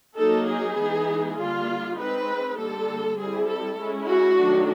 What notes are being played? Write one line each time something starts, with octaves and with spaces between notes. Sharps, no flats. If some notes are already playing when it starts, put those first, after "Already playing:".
F#3 A#3 D#4 A4
G#4
E3 G#3 B3 D#4
D3 G3 A#3 F4
G#3 C4 D#4 B4
D3 G3 A#3 A4
G3 C4 E4 G#4
A4
G#3 C#4 E4
F#4
D#3 F#3 A3 D4